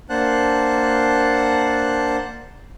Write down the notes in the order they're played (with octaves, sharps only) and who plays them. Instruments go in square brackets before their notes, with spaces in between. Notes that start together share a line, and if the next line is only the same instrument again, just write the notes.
[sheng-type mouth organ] A#3 D4 C5 F#5 A5 F#6